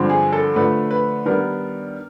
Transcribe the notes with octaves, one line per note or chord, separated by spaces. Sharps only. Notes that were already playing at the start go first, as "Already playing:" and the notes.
Already playing: G2 D3 F3 G#3 C4
G#4
A4
D3 F3 A3 B4
B4
D#3 G3 B3 D4 A#4